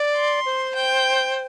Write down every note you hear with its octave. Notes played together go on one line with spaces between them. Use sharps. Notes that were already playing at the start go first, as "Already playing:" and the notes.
Already playing: D5
C6
C5
G5